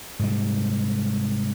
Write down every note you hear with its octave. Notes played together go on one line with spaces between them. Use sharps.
G#2 C3 G3